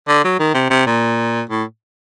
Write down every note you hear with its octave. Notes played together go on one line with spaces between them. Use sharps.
D3
F#3
D#3
C3
C3
A#2
A2